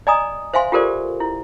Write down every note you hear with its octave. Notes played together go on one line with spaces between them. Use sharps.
D5 D#5 G#5 A#5 D#6
C5 E5 F5 G#5 C6
F4 G4 A4 A#4 C5 D5
E4